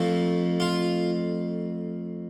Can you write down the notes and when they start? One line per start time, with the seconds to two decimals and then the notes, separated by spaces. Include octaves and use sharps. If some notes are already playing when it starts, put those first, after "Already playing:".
Already playing: F2 F3 A3
0.60 F4